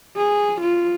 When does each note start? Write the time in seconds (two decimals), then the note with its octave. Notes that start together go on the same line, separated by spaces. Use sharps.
0.17 G#4
0.61 F4